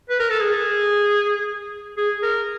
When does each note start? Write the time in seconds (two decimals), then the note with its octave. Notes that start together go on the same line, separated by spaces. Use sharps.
0.10 B4
0.20 A#4
0.30 A4
0.41 G#4
1.97 G#4
2.23 A#4